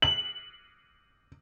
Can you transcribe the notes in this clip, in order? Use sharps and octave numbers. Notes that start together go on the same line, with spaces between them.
F#7